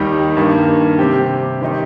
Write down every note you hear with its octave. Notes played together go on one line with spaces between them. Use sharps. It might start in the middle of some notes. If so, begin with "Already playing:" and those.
Already playing: D#2 D#3 G3 D#4
G2 D#3 A#3
C3 G3 C4 G4
D#3 C4 D#4 G4